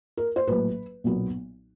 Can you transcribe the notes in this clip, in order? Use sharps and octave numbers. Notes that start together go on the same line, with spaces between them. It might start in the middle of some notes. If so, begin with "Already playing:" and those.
A#4
C5
A#1 A2 F#3 B4
B1 A#2 F#3 B3